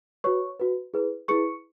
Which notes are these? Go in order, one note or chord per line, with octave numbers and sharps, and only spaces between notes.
F#4 B4 C#5 C#6
F#4 B4
E4 G#4 B4
E4 G#4 B4 C#6 C#7